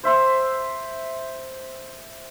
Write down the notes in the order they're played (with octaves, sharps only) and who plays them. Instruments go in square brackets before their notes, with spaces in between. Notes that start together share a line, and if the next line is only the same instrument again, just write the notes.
[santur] C5 E5 C6